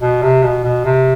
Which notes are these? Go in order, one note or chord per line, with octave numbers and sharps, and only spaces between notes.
B2
C3
B2
B2
C3